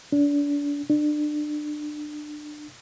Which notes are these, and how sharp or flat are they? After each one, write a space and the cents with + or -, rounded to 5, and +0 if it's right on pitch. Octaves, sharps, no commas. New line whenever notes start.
D4 -30
D4 +30